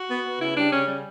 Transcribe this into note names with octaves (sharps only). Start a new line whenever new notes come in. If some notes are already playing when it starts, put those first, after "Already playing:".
Already playing: F#4
B3
B3
C#3 E4
G3 D4
C#3 C#4
G3